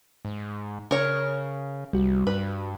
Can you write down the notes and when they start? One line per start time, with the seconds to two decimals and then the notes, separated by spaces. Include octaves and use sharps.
0.25 G#2
0.91 C#3 A#4 C#5
1.93 C2 G3 F#4
2.27 G2 B4